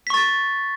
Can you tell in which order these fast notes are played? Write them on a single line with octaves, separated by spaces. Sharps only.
B6 C#6 A6